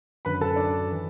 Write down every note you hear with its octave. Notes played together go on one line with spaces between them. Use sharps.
F#2 D3 B4 B5
A4 A5
D4 D5
E3